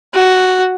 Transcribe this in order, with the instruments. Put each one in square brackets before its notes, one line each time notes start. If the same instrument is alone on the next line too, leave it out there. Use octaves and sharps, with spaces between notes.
[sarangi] F#4